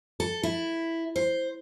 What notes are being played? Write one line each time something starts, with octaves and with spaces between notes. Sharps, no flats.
A4
E4
C5